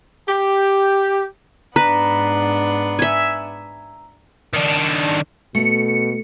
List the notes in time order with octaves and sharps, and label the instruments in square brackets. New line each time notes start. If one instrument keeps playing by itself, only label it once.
[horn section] G4
[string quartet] G#2 B3 D4 [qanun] B4 [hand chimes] A#5
[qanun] E5 G#5
[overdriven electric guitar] D#3 D4
[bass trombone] B2 [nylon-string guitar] A3 [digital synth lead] C#7